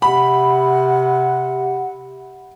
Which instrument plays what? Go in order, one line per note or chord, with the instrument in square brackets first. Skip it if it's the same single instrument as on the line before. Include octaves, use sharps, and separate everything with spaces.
[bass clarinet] C3 [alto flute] F#5 [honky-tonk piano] B5